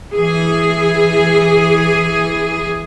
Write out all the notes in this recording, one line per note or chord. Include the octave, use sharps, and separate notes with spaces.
E3 G#4